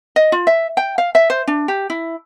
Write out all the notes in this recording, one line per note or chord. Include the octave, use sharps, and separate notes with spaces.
D#5
F4
E5
G5
F5
E5
C5
D4
G4
E4